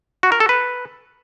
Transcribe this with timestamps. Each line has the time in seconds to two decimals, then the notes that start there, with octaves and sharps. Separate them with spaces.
0.23 F#4
0.32 A#4
0.40 A4
0.49 B4